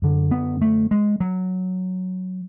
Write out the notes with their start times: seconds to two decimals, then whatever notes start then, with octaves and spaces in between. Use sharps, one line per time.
0.02 F#2 D3
0.31 B3
0.61 A3
0.91 G#3
1.20 F#3